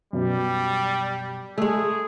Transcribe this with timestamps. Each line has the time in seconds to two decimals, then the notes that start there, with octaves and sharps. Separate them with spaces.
0.13 F#2 B2 G3
1.58 G#3 A3 G#4